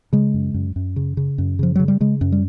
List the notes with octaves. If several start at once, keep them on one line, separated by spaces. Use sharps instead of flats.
C#3 G#3
F#2
F#2
F#2
C#3
C#3
F#2
C#3 F3
C#3 F#3
G3
C#3 G#3
F#2
G3